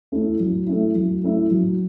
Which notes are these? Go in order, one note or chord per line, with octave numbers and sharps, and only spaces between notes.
A3 C#4 E4
F#3
A3 C#4 E4
F#3
A3 C#4 E4
F#3